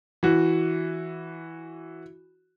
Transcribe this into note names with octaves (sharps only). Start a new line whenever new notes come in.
E3 F#4